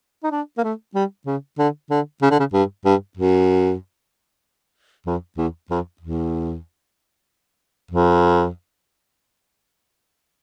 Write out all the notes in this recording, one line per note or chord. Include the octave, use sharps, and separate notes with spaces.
D#4
D4
A#3
A3
G3
C#3
D3
D3
C#3
D3
C#3
G2
G2
F#2
F2
E2
F2
E2
F2